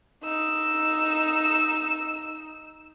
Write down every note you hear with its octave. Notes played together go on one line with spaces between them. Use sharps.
D#4 E6